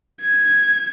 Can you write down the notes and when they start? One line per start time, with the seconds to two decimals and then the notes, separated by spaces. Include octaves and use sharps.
0.21 G#6